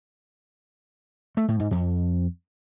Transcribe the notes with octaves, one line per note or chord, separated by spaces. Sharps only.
A3
A2
G#2
F2